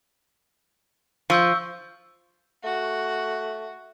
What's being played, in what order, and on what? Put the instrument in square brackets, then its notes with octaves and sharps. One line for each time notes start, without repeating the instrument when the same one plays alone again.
[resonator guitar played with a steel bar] F3 [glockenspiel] C#6 E6 G6
[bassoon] A3 [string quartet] F#4